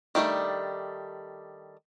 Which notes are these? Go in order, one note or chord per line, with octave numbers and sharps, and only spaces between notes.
D#3 G3 A3 D4